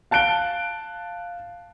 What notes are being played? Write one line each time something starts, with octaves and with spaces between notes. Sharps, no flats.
F5 A5 F#6 D7 G7